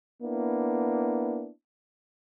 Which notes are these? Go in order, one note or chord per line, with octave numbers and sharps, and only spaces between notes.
A#3 B3 D4 E4